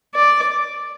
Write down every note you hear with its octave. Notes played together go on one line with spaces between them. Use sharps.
D5